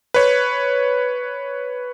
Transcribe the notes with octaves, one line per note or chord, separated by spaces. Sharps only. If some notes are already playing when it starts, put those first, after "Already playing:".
B4 C#5